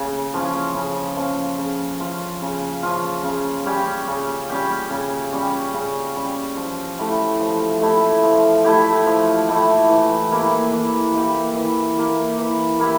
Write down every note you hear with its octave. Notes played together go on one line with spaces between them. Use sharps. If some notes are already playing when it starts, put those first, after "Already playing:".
Already playing: C#3
F3 C#4 F4
C#3
F3 C#4 F4
C#3
F3 C#4 F4
C#3
F3 C#4 F4
C#3
G3 C#4 G4
C#3
G3 C#4 G4
C#3
G3 C#4 G4
C#3
G3 C#4 G4
F3
A3 E4 G4
F3
A3 E4 G4
F3
A3 E4 G4
F3
A3 E4 G4
E3
A#3 E4 G4
E3
A#3 E4 G4
E3
A#3 E4 G4
E3
A#3 E4 G4